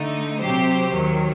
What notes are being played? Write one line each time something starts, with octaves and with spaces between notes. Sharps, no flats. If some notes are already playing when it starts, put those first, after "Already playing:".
Already playing: D3 A3 D#4
C3 F#3 C4 G4 C5
D#2 D#3 F#3